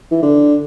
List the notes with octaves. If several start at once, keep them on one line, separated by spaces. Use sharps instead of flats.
E3
D3